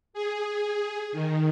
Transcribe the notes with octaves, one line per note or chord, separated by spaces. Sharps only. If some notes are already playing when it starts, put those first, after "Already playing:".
G#4
D#3